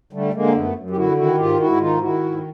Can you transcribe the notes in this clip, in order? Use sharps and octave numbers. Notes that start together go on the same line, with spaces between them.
D3 G3 A3
D3 G#3 A#3
C4
F#2 A3 B3
F#2
G4
D3 E4 F#4
D#3 E4 F#4
G#2 F4 G4
G#2 E4 F#4
D#3 D#4 F4
D#3 E4 F#4
G#2
F#4